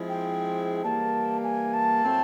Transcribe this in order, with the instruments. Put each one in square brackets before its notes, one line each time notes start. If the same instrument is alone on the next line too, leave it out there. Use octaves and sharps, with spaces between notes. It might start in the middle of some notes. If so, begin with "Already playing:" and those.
Already playing: [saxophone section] F3 G#3 C4 E4 G#4
[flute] G5
[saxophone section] E3 G3 A#3 [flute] A5
[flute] G#5
A5
[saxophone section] A2 F#3 A3 C4